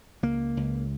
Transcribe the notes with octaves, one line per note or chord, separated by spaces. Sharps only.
C#2 A#3
C#2